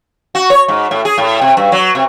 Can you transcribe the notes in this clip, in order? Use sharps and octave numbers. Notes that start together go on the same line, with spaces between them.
F#4
C#5
G#2
A2
G#4
A2
C3
G2
F#3
C3